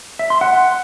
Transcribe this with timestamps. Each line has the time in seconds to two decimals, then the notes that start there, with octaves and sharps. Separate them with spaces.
0.19 E5
0.30 C6
0.41 F#5